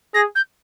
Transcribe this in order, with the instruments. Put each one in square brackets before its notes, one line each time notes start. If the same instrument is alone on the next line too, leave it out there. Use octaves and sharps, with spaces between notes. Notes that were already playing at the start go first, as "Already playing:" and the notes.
[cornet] G#4 [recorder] A#6
[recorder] G6